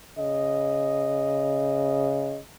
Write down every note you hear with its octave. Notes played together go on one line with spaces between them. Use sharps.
C#3 D#5